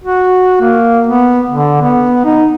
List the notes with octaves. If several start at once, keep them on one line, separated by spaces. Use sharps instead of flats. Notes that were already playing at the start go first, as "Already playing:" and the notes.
F#4
A#3
B3
D3
B3
D#4